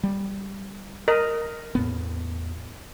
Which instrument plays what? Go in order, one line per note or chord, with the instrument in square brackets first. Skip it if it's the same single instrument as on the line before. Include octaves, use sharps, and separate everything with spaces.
[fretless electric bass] G3
[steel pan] A#4 D#5
[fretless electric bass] E2 A2 B3